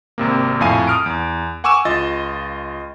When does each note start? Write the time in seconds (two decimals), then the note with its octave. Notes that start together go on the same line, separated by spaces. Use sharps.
0.18 G#1 C3 A#3
0.60 A#1 F2 A2 F5 G#5 D#7
0.87 D#6 F6 D7
1.06 E2
1.64 F#5 G#5 C#6 D6 E6 E7
1.85 C#2 F4 D#5 A6